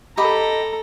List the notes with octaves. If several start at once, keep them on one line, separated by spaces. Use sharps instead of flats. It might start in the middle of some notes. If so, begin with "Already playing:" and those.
G4 A4 D#5 A#5 B5